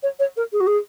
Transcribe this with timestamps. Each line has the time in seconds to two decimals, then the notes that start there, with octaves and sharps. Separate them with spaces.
0.03 C#5
0.19 C#5
0.36 A#4
0.52 G#4
0.60 F#4
0.67 G#4